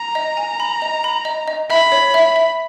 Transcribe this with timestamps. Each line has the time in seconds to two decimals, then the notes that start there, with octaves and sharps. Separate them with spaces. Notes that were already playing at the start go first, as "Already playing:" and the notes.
Already playing: A#5
0.15 D#5
0.37 G#5
0.60 B5
0.82 D#5
1.04 B5
1.25 D#5
1.48 D#5
1.70 E5 B5
1.92 C#5
2.14 E5
2.36 E5